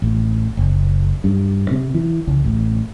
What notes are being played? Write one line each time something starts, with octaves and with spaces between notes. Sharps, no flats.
A1
F#1
G2
C3
E3
C#2
A1